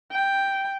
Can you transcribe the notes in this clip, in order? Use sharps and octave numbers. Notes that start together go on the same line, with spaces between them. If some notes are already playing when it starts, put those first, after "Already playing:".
G5